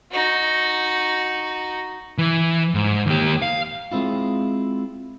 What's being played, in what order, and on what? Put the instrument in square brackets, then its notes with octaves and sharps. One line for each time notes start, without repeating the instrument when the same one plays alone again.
[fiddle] D#4 F#4
[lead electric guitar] E3
G#2
D#2 G4
F5
[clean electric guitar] G#3 C4 E4 F4